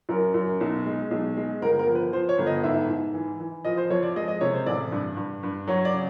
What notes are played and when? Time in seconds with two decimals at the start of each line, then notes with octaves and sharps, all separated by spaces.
0.09 F#2 A#4
0.34 F#2
0.61 B1
0.86 G#3
1.11 B1
1.37 G#3
1.62 G1 A#4
1.79 A#4
1.87 F3
1.95 B4
2.13 F3 C5
2.29 C#5
2.38 G1
2.47 D#5
2.64 G#2 E5
2.89 G#2
3.14 E3
3.40 E3
3.65 F3 D#5
3.77 C5
3.90 F2 C#5
4.03 D5
4.16 G#3 D#5
4.28 D#5
4.41 C3 C#5
4.54 C5
4.66 A1 D5
4.92 G2
5.17 G2
5.43 G2
5.67 F#3 C#5
5.85 D5
5.94 C#3